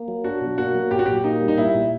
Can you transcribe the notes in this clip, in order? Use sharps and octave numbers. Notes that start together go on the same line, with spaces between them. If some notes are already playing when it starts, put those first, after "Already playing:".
Already playing: A#3
F#3
D4 F#4
B2
A#3 F#4
F#3
A#2 G4
F#4
A#2 G4
A#3 D#4
G3
D#4
A#2 E4
A#2